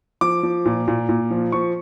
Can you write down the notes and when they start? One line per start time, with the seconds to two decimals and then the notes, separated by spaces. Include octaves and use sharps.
0.21 F3 D6
0.43 F3
0.65 A#2
0.88 A#2
1.09 A#2
1.31 F3
1.52 F3 C#6